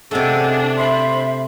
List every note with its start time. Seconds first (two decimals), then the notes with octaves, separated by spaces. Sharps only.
0.11 C3 A3 D4 G#4 D5 D#5 F#5
0.78 C5 E5 B5 C6